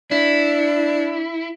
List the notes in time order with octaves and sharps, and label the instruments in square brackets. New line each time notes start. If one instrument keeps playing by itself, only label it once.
[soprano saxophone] D4 [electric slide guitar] E4